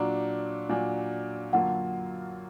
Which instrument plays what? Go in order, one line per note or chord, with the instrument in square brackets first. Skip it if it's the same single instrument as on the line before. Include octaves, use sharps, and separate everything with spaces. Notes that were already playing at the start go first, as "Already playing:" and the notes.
Already playing: [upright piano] A#2 F#3 D4 [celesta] A#5
[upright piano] A#2 F#3 D4 [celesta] G#5
[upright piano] F#2 D3 F#3 A#3 F4 [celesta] F#5